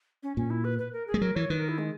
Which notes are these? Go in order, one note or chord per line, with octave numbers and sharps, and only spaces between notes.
C#4
A#2 C#4
E4
B4
B4
A#4
G#4
G#3
F#3 A#4
E3 C#5
D#3 B4
A#4
E4
G#3